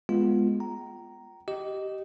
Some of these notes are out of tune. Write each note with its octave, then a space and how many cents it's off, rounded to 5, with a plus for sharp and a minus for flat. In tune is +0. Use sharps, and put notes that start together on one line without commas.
G#3 +0 B3 +0 F4 +0
G5 -35 A#5 +0
G4 -20 D#5 +0